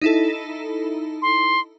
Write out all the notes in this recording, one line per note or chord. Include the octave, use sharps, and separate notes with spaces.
D#4 E4 A4
C6